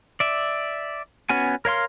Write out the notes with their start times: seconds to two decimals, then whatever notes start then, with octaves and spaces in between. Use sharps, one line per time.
0.20 D5 E5
1.29 B3 C#4 F#4 G#5
1.65 A#4 C#5 F5 C6